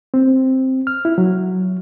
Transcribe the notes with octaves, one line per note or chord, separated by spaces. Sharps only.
C4
F6
E4
F#3